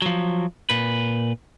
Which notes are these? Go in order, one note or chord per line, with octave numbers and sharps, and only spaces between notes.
F3 F#3
A#2 B4